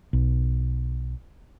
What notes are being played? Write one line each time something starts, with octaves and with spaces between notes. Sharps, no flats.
B1